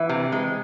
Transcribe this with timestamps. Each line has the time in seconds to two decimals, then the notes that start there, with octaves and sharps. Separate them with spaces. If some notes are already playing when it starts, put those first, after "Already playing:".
Already playing: E3
0.09 C3
0.32 G#3